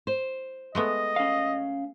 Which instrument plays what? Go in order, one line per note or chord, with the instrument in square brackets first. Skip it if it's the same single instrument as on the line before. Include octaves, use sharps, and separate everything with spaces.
[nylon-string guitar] C5
[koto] G#3 A3 B3 [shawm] D#5
[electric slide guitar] C#4 F5